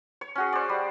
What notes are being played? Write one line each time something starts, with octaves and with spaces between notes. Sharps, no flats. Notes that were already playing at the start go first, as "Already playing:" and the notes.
C#5
C#4 F#4 G#4
C5 D5
G3